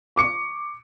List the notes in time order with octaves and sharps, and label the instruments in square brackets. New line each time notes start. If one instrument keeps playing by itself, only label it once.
[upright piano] C#6 D6 C#7